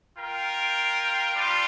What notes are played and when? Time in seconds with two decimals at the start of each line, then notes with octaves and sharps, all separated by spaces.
0.16 F4 A#4 G5
1.35 G3 D4 F4